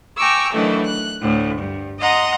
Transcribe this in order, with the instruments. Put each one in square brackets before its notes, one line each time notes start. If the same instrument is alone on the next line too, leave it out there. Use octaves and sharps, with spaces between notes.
[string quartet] G5 G#5 A#5 C#6 D6 E6
D#3 E3 F#3 A3 D4 E4
F#6
D2 A2
G2
D#5 F#5 A#5 C6 D#6